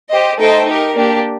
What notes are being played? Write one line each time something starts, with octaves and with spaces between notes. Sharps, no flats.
G4 C5 D#5
A3 D#4 A4 C5 G5
D#4 G4 A#4
A#3 D4 G4